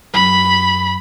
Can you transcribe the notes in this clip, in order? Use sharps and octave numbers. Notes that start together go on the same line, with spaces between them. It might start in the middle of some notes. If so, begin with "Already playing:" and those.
F#2 B5